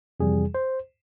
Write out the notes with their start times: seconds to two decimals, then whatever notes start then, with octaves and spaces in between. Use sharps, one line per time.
0.20 F2 C3 E3 G3 G#4
0.54 C5